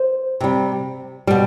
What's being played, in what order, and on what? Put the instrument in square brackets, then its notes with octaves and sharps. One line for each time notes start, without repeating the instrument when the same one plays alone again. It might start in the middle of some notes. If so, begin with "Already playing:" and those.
Already playing: [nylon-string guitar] C5
C3 G3
B2 G3